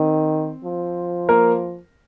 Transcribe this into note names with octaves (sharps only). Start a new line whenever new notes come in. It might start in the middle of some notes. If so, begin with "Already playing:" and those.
Already playing: D#3 C4
F3
A#3 A#4